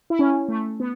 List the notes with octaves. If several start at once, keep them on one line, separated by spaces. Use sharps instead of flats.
E4
C#4
A3
B3